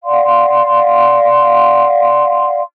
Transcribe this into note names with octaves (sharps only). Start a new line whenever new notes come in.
D5 F5 F#5 C6